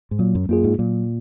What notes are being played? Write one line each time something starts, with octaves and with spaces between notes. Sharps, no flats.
G#2
A#2 F#3
F#2
F#2 A#3 F4 G#4
G#2
A#2 F#3